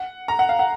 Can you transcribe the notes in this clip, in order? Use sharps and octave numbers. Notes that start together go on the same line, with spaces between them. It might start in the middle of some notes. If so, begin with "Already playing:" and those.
Already playing: F#5
A#5
F#5
F5
F#5